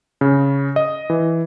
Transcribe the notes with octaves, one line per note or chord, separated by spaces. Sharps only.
C#3
D#5
E3